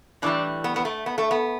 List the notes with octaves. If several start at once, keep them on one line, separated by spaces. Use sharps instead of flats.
A2 E3 G3 D4
B3
B3
A3
B3
A3
B3